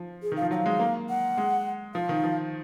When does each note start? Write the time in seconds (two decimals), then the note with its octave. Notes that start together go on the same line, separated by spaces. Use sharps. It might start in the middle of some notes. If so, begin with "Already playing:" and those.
Already playing: F3
0.23 G#4
0.32 D#3
0.37 F5
0.42 F3
0.51 F#3 F#5
0.55 F5
0.66 G#3
0.79 A#3
1.09 F#5
1.37 G#3
1.94 F3 F5
2.09 D#3
2.24 F3